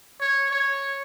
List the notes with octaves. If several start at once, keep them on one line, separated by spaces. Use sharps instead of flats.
C#5
C#5